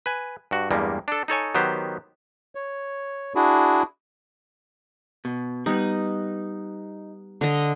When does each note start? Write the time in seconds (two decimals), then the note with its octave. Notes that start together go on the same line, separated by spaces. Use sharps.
0.06 B4 G#5
0.51 G2 F#4
0.71 E2 G2 G3 G#3 A#3
1.08 D4 A4
1.28 D#4 A4 C#5 G#5
1.55 D#3 F#3 B3 G4 C5
2.55 C#5
3.35 D4 E4 F#4 G#4
5.25 B2
5.66 G3 B3 D#4
7.41 D3 D#5